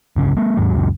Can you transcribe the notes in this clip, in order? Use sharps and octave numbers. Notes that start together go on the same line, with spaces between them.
G1 C#2 C#3
G#3 A#3
G#1 D#2 G#2 F#3
F#1 C#2 F#2 A#2